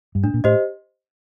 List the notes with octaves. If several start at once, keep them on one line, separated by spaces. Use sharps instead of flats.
G2
A2 D4
A#2
A2 G4 C5 D#5